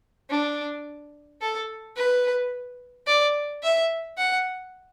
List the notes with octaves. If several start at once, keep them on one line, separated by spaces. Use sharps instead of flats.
D4
A4
B4
D5
E5
F#5